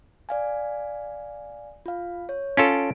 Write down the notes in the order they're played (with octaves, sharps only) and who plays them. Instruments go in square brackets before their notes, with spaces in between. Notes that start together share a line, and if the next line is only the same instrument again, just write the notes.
[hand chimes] D5 F5 G#5
F4 F5
C#5
[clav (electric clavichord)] C#4 F4 A4 [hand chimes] D7